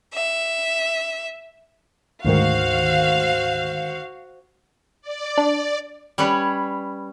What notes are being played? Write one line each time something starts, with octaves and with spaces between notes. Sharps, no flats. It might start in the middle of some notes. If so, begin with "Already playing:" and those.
E5
D2 G#2 D#3 F#4 C5 F5
D5
D4
G3 C#4 B4 C#5